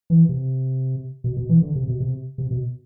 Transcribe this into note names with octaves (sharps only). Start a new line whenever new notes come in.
E3
C3
B2
B2
E3
D3
C3
B2
C3
C3
B2